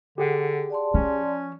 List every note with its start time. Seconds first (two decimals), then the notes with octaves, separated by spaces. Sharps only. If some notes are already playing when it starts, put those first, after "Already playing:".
0.18 D3 G4 G#4 F#5
0.70 D5 A5 C6
0.94 F3 C#4